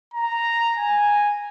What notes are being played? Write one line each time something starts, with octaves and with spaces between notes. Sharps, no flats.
A#5
G#5